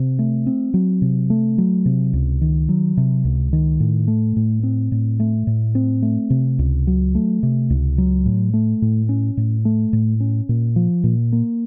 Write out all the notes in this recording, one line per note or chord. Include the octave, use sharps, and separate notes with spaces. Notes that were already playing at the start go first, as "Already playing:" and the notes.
Already playing: C3
A3
C4
F#3
C3
A3
F#3
C3
C#2
D#3
F#3
C3
C#2
D#3
A2
A3
A2
C4
A2
A3
A2
C4
A3
C3
C#2
F#3
A3
C3
C#2
F#3
A2
A3
A2
C#4
A2
A3
A2
C#4
A#2
F3
A#2
A#3